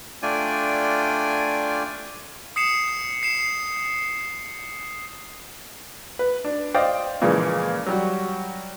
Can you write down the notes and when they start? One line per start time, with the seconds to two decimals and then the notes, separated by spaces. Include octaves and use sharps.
0.22 A3 D4 F4 D5 G5 G#5
2.56 D#6 C7 C#7 E7
3.23 C7 E7
6.19 B4
6.45 D4
6.74 C5 D5 D#5 F5 G5
7.21 A#2 C#3 E3 F3 G#3 A#3
7.86 F#3 G3 F#4